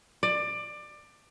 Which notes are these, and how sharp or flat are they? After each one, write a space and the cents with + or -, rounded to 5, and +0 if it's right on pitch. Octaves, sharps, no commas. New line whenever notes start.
D5 +20